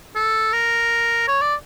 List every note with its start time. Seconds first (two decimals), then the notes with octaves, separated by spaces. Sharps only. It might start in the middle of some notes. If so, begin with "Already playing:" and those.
0.15 A4
0.53 A#4
1.28 C#5
1.41 D5